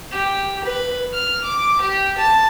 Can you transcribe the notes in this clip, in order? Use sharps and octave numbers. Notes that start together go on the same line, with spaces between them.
G4
B4
F6
D6
G4
A5